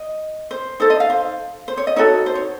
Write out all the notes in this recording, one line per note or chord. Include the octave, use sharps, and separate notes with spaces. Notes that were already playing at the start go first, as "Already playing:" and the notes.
Already playing: D#5
C5
D#4 A4 C5
D#5
F5
C5
C5
C#5
D#5
D#4 F#4 A4 C#5
C5
C#5